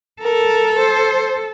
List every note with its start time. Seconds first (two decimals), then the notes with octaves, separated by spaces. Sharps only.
0.22 A4 A#4
0.78 C5